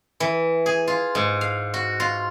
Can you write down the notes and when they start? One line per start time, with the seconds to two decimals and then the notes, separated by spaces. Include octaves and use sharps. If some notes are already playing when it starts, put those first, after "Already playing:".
0.20 E3
0.66 G#4
0.87 F4
1.15 G#2
1.41 F5
1.74 F#4
2.00 F4